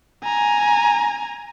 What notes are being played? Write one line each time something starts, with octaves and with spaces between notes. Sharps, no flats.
G#5 A#5